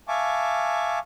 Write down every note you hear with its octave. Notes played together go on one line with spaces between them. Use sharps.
E5 F5 G#5 A5 C#6 D6